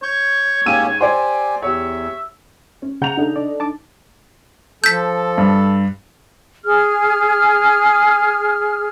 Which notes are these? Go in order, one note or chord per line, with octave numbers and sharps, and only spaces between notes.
C#5 C#6 G6
G#2 A#3 C#4 G4 E6 D#7
G4 C5 D5 G#5
E2 G4 C#5 E5
C#4
C#3 F#5 A#5 G6 F7
D4 D#4 A4
D5
A5 D6
F3 A4 G6 B6
G2
G#4 F6